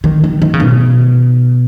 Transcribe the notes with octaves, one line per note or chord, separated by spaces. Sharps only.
D#3
D#3
D#3
C#3
B2